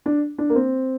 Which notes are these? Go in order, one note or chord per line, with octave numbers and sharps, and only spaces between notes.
D4
D4
A#3
C4